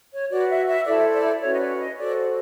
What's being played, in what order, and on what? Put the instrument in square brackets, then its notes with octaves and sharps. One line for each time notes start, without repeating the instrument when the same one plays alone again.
[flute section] C#5
F#4 B4 D5
E5
E5
E4 A4 C5 D5
D5
C#4 F#4 B4 C#5
D#5
D5
D#5
F#4 A4 C5 D5